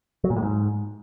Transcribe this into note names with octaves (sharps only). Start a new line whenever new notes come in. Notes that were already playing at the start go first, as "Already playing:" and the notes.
F#3
A#2
A2
G#2